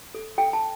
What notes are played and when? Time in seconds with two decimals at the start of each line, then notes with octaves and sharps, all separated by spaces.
0.14 A4
0.38 A4 G5
0.53 A5